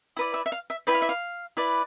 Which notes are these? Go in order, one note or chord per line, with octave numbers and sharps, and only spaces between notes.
E4 B4 D5
E5
E5
F5
E5
E4 B4 D5 G5
F5
E5
F5
E4 B4 D5